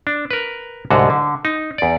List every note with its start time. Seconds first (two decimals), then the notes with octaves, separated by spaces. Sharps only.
0.07 D4
0.31 A#4 B4
0.90 C2 G#2 D3 F#4
1.10 D3
1.45 D#4
1.78 E2 D5